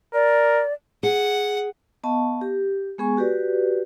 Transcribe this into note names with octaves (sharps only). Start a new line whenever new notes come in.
A#4 D5
G#4 F#5
B3 D#5 F5 A5 C#6
G4
G#3 B3 G#4 G#5 C#6
F#4 G4 B4 D5